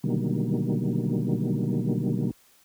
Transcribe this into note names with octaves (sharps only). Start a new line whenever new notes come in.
B2 D3 D#3 F#3 G3 A#3